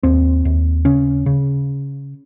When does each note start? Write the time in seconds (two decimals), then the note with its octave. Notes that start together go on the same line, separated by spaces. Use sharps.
0.03 D#2 C4
0.45 D#2
0.85 C#3 C#4
1.26 C#3